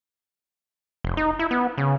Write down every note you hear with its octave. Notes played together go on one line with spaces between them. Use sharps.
F1
D#4
E4
B3
C#3